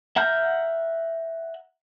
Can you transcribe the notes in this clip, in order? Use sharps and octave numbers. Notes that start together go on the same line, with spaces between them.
E5 F#5 A#5 F6 G6